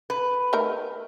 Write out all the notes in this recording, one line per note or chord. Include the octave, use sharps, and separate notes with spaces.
B4
A3 D#4 A#4